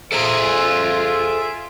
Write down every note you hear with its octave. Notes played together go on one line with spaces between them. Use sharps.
F4 G#4 A4 C5 E5 A#5 D7